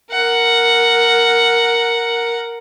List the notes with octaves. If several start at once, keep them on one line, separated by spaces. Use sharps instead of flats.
A#4 F#5